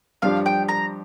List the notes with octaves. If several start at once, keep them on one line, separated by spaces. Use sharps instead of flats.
G2 F3 D4 G4 F5
G5
A#5